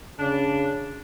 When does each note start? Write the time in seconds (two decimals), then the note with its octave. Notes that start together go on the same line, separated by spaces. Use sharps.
0.19 C#3 D4